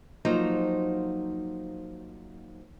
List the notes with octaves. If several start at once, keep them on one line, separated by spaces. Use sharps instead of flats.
F3 F#3 A#3 D#4 C5